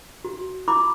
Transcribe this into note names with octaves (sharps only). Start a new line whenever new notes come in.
F#4
E4 B5 D6